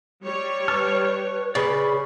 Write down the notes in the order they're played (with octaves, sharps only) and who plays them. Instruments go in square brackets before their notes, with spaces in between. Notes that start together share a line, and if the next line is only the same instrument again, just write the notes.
[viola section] G3 C#5
[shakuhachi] B4 [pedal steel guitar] A5 C#6 F6
[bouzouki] C#3 [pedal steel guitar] D5 B5